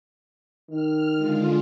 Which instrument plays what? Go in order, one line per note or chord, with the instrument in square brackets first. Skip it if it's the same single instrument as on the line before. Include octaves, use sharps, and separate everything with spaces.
[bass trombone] D#3 [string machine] F6
[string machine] D3 G#3 F4